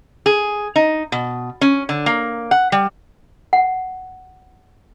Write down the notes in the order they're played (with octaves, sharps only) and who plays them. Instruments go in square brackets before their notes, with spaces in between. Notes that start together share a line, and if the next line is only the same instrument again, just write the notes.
[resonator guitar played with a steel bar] G#4
D#4
B2
C#4
D3
A#3
F#5
G3
[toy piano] F#5